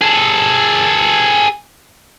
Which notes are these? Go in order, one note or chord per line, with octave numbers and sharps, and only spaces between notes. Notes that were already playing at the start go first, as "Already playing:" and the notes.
G#4 A4